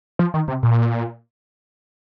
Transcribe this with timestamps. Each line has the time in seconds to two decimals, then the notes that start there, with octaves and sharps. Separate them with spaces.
0.19 F3
0.34 D#3
0.48 C3
0.63 A#2